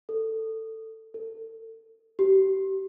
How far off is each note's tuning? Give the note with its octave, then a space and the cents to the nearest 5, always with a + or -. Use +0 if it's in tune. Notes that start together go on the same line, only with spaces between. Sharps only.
A4 +15
A4 +35
G4 -30